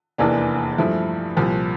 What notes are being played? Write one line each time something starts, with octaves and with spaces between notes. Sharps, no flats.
F1 E2 E3 A#3 D4
G2 F3 A3 E4
C2 A#2 F3